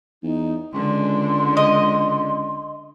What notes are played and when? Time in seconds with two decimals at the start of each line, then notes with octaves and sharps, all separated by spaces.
0.23 E2 D#4
0.74 C#2 D3 G#3 C6
1.57 D#5